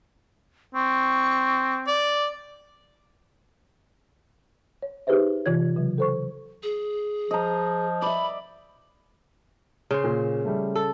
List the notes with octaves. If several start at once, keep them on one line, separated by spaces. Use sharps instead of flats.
C4 C#6
D5
C#5
D#4 G4 G#4 B4 C5 E5
C3 E3 F4 C#5 G#6
C#3 F#3
A4 C5 C#6
G#4
F3 D#5 A#5
D5 E5 B5
C#3 C5
A#2
G3 A3
A4